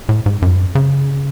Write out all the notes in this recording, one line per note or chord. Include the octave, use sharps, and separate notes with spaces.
A2
G#2
F#2
C#3